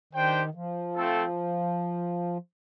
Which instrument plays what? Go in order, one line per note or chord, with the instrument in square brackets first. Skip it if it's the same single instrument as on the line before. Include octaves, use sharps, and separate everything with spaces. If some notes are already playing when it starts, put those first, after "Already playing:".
[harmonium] D#3 [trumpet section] D4 G4 C5 G5
[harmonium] F3
[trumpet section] A3 C4 F4 A4